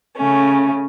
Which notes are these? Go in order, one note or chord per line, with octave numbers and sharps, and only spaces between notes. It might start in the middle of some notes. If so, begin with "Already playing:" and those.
C#3 A3 C#4